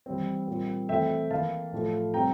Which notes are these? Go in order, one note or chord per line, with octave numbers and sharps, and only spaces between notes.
E3 G3 C4
A#2 G3 C4
E3 A3 C4 E5 G5
E3 A#3 F5 A5
A2 F3 A3
C3 G3 C4 G5 A#5